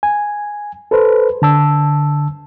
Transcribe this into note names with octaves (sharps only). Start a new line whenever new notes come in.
G#5
A4 B4 C5
D3 A5 E6